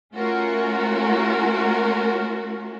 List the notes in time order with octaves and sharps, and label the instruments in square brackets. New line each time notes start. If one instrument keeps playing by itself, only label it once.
[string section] A3 C#4 F4 F#4 A#4